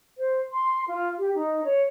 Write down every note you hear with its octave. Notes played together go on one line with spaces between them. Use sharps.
C5
C6
F4
G4
D#4
C#5